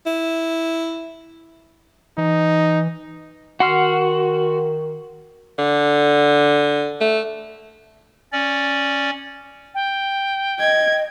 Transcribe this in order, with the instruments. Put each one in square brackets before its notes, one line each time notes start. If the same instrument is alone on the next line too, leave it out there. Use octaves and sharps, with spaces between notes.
[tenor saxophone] E4
[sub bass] E3 [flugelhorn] D#4
[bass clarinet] D#3 [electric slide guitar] F#4 [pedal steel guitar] F#5 C6 F6
[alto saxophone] D3
A3
[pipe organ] C#4 D5
[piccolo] G5
[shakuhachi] D#5 [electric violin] G#6